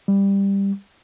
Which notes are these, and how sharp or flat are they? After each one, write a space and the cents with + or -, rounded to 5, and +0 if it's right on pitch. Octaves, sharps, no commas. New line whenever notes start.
G3 +10